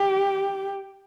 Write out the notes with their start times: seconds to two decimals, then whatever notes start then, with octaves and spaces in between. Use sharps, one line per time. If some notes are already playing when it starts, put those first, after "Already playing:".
Already playing: G4